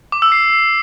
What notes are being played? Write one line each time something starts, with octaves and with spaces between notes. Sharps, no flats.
D6
E6
C7